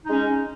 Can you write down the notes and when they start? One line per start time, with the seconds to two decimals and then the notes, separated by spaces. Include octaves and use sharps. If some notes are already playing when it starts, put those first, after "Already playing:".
0.05 D#4
0.08 G#3
0.12 C#4